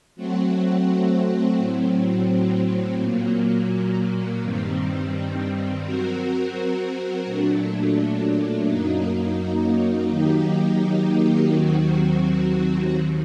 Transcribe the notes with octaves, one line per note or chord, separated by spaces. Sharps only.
F#3 A3 C4 F#4
A2 F#3 C4
A#2 F#3 A#3
G2 D#3 G3 C4
F#3 C4 F#4 A#4
A#2 F#3 A3 D4
F#2 F#3 A#3 D#4
D#3 F#3 A#3 D#4 G4
D#2 D#3 F#3 C4 F#4
D#2 D#3